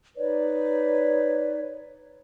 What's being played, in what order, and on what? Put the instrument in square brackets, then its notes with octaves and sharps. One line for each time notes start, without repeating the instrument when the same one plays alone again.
[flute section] D#4 B4 C#5 D5